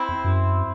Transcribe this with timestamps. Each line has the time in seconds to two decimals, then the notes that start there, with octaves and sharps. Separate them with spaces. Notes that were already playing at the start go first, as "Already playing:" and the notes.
Already playing: C4 E4
0.09 E2
0.24 F#2